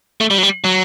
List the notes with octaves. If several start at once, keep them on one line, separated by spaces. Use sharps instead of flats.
A3
G3
F#3
G3
F#3